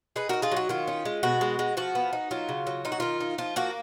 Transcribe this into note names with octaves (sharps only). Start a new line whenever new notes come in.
D#4 G#4 B4
D#4 F#4 A#4
F4 G#4
F#3 F#4
D#3 F4
C#4
G#3
B2 F#4
G#3
G#3
F3 F#4
B3
D#4
F#3 F4
C#3
F#3
D#4 F4
F#4
D#3 F4
D#4
F3 F4
A#3 F#4